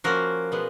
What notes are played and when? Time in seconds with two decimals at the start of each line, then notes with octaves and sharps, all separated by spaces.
0.04 F3 A#3 C#4 F#4 A#4
0.52 B2 G#3 B3